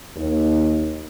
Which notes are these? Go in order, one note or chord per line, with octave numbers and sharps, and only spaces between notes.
D#2